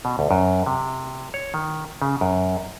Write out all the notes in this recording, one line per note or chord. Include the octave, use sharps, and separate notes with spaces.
B2
D2
F#2
C3
C#5
D#3
C#3
F#2